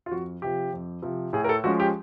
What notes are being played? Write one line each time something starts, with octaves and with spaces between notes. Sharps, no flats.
F4
F2 F#4
C3 F3 G4
F2
C3 F3
A2 G#4
A#4
A4
F3 G#3 C#4 F#4
G4